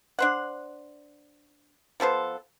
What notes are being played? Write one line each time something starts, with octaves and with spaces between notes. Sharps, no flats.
D4 C5 F#5
F3 B3 A4 C5